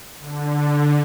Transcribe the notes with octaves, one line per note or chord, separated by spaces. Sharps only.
D3